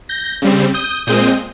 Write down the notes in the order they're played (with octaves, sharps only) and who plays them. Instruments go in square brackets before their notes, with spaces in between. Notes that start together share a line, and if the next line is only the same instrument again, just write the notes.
[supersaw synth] G6 A#6
C#3 G3 C4
D#6 G6
A#2 G#3 C4 D#6 G6